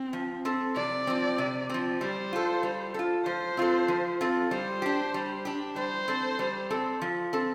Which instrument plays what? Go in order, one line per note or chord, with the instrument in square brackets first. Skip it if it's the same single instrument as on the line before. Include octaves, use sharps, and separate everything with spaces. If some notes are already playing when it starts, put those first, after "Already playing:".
Already playing: [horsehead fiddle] C4
[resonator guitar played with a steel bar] F3
C4 A4
[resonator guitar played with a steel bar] C3 [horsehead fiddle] D5
[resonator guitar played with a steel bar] F3 C4
C3
F3 C4
[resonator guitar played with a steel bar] G3 [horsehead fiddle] C5
[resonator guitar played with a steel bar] F4 A4
G3
F4 A4
[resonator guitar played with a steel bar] F3 [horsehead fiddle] C5
[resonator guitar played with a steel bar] C4 F4 A4
F3
C4 F4 A4
[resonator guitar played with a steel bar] G3 [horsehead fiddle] C5
[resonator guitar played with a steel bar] D4 G4
G3
D4 G4
[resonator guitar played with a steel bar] G3 [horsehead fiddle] C5
[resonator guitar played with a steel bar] C4 A4
G3
C4 A4
F3
C4 A4